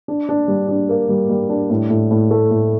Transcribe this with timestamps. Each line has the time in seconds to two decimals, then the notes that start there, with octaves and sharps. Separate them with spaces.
0.08 D4
0.29 D4
0.48 G3
0.69 D4
0.89 A#3
1.09 G3
1.29 G3
1.49 D4
1.70 A2
1.90 A2
2.11 A2
2.31 A3
2.51 A2